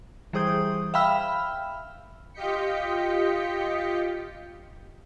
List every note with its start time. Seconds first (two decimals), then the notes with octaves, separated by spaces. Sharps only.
0.33 E3 G3 G#4 C5 D#6 G6
0.94 E5 F5 G5 B5 E6 F6
2.34 F4 G4 D#5 G6 B6 C#7